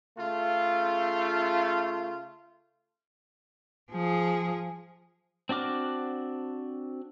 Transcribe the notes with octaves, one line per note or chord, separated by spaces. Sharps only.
C#3 A3 F4
F3 G#4
C4 D4 F#4 D6 F6